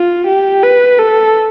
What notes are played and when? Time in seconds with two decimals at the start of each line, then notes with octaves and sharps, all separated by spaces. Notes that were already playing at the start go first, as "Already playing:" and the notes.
Already playing: F4
0.27 G4
0.64 B4
0.99 A4